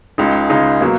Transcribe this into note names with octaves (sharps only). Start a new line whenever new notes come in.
C#2 C#3 G#3 D#4
C#2 C#3 G#3 D#4
B2 F#3 A#3